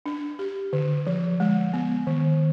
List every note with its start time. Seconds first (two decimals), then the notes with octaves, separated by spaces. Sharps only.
0.06 D4
0.39 G4
0.73 D3
1.07 F3
1.40 G#3
1.73 B3
2.07 D#3